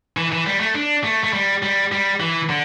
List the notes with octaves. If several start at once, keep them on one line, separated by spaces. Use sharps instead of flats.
E3
E3
G3
A3
D4
A3
A3
G3
G3
G3
E3
D3